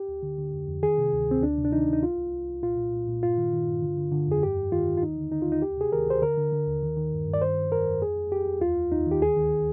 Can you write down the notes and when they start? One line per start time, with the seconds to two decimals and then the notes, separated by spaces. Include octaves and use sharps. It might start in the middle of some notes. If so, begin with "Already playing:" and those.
Already playing: G4
0.08 D2
0.23 D3
0.38 D3
0.53 F2
0.68 F2
0.83 D#3 G#4
0.98 C3
1.13 D2
1.28 D2 C4
1.43 D2 D4
1.57 C3
1.65 D4
1.72 D#3 D#4
1.88 D2 D#4
2.03 C2 F4
2.18 C2
2.33 C2
2.48 C2
2.62 A#2 F4
2.78 A#2
2.93 A#2
3.08 A#2
3.23 G2 F4
3.37 D#3
3.53 D#3
3.67 G2
3.82 D3
3.97 D3
4.12 D3
4.28 F2 G#4
4.43 G2 G4
4.57 G2
4.72 D#3 F4
4.88 D#3
4.97 F4
5.02 D#2 D#4
5.17 D3
5.32 D3 D#4
5.42 F4
5.47 D#2 D#4
5.62 D2 G4
5.77 C3 G#4
5.92 D#3 A#4
6.07 D2 C5
6.22 D3 A#4
6.37 D3
6.52 D3
6.67 D#2
6.83 D#3
6.97 D#3
7.12 G2
7.27 G2
7.34 D5
7.42 D#3 C5
7.57 D#3
7.72 F2 A#4
7.87 F2
8.02 F2 G#4
8.16 F2
8.31 F2 G4
8.47 F2
8.61 D#2 F4
8.77 D#2
8.92 D#2 D#4
9.07 D#3 G4
9.21 D2 G#4
9.37 D#3